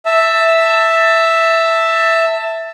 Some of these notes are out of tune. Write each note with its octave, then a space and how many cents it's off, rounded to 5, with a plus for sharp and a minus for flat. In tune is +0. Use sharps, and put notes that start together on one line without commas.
E5 +0 A5 +15